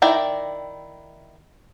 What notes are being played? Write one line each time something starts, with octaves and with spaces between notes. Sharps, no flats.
D#3 E4 D5 G5 A#5